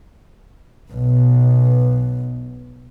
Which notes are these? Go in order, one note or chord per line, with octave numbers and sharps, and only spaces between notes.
B1 B2